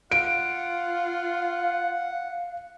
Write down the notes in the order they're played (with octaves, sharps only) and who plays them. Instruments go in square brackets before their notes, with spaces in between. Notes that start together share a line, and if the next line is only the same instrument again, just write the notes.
[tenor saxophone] F4 [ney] F5 [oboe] F#5 [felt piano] D7